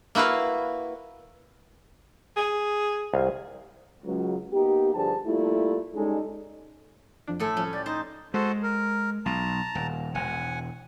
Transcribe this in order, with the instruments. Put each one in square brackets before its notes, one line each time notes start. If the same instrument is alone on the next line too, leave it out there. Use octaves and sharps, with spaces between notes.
[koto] A#3 E4 F#4 B4 F5
[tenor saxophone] G#4
[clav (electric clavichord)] C2 F5
[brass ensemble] C#2 F#3
A#3 B3 D#4 G4
G2 D3 F3 G4 G#4 A5
G3 A3 A#3 E4 F4
G3 G#3 C#4 D#4 A4
[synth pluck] F2 F3 D4
[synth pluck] G#1 [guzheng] A2 A4 G#5 [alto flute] A3
[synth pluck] C2 F3 [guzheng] C#4
[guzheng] G4 [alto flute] D5
[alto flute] D#4 [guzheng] C5 A5
[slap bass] G#3 [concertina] F#4 A4 C5
[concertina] A#4
[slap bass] B1 [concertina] A5 A#5
[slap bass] D#1
[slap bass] E1 [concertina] F#5 G#5